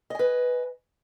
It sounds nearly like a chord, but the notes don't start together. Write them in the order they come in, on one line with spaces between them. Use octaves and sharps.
D#5 G#5 B4